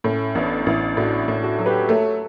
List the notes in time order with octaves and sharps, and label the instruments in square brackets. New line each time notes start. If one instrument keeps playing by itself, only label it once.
[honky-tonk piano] A2 [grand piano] A3 C#4
[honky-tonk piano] A1 [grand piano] B3 D4
[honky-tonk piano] A1 [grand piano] C#4 E4
[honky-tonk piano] A2 [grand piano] D4 F#4
[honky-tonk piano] A2
[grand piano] F#4 A4
[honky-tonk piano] F#3
[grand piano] G4 B4
[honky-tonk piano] A3 [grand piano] A4 C#5